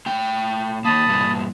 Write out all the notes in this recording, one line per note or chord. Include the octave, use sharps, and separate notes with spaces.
A2 G5
D#3 A#3 A5 B5 D#6
G2 A#2 E3